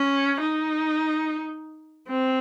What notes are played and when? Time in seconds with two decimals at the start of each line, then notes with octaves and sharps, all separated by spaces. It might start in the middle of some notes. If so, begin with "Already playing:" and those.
Already playing: C#4
0.41 D#4
2.08 C4